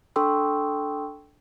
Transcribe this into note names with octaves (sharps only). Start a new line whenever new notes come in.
D4 A4 G5 C6 C#6 E6